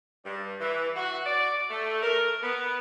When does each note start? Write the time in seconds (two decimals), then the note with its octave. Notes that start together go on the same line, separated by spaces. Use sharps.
0.25 G2
0.60 E3
0.96 F#4
1.25 D5
1.70 A3
2.02 A#4
2.43 B3